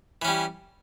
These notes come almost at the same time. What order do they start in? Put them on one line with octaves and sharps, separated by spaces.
E3 C#4 G3